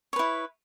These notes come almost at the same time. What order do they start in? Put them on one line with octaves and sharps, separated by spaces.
C#5 B4 E4